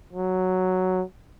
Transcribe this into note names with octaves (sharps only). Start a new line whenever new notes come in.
F#3